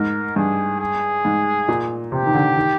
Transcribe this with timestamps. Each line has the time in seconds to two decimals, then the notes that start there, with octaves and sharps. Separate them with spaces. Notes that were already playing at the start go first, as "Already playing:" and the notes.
Already playing: G#2 A#4
0.36 G2 G#4
0.80 G#4
1.25 G#2
1.68 A#2
2.12 C3 G4
2.26 D#3
2.35 D3
2.56 D#3